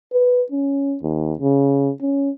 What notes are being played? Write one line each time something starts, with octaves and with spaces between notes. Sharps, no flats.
B4
C#4
D#2
C#3
C#4